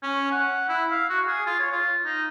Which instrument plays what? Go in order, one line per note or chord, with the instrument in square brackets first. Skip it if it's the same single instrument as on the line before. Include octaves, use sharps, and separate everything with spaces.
[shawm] C#4
F#5
E4
F5
F#4
G#4
F4
C#5
F4
D#4